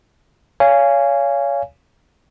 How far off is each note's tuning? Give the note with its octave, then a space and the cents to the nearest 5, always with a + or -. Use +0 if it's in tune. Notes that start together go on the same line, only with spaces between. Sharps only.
C#5 +25 F5 -20 G#5 -5